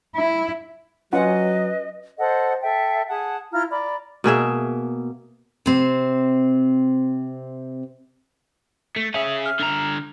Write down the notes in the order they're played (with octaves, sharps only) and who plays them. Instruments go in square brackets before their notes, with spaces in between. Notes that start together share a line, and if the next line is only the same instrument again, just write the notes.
[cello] E4
[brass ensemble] F#3 [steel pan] C#4 F4 F#5 [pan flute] B4 [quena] D#5
[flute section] A4 C5 D#5 F#5
A4 E5 G5
G#4 F#5 A5
E4 F4 A#5 F6
D5 A#5 B5
[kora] B2 A#3 G#4 E5
[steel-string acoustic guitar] C3 C4
[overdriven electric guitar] A3
[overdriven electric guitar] C#4 G#4 [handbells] E5
[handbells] F6
[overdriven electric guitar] D3 A#5